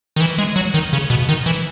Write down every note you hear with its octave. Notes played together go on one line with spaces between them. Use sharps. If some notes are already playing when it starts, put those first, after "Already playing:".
D#3
E3
G#3
F#3
D#3
C#3
B2
D#3
E3